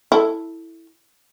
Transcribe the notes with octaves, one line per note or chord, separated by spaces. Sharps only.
E4 A4